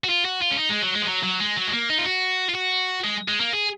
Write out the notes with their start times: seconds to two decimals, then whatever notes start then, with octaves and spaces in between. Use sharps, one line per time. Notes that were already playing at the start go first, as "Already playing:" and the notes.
0.04 F#4
0.09 F4
0.25 F#4
0.42 F4
0.51 C#4
0.58 D#4
0.70 G#3
0.82 F#3
0.95 G#3
1.02 F3
1.07 F#3
1.23 F#3
1.40 G#3
1.56 F#3
1.67 G#3
1.73 A#3
1.90 D#4
1.98 F4
2.06 F#4
2.49 F4
2.55 F#4
3.04 G#3
3.28 G#3
3.41 A#3
3.53 G#4